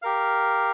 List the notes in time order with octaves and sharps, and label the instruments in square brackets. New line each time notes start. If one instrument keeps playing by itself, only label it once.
[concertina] G4 A#4 F5